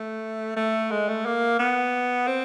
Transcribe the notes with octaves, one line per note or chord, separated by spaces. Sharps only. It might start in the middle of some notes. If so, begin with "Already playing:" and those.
Already playing: A3
A3
G#3
A3
A#3
B3
C4